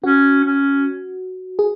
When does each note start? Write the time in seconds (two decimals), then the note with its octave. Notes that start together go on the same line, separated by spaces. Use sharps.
0.04 C#4 F#4
0.44 C#4
1.59 G#4